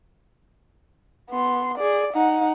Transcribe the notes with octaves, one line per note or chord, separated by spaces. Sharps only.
B3 C6
G#4 D5
D#4 F#5